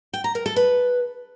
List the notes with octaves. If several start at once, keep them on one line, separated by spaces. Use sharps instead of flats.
G5
A#5
A#4
A4
B4